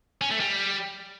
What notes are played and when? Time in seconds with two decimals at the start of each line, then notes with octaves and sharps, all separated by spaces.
0.21 C#4
0.31 A3
0.40 G3